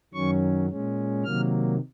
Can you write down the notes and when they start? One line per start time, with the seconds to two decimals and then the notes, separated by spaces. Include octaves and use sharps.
0.14 F#2 D#3 F#3 C#4 C#6
0.70 A#2 G#3 C#4
1.24 C3 D#3 F#3 A#3 F6